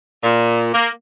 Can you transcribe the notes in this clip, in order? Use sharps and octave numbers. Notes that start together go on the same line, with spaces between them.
A#2
A#3